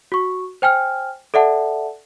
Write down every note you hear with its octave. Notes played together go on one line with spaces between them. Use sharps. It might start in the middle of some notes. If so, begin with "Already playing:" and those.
F#4 C#6
C5 G5 G#5 F6
A4 D5 E5 F#5 A5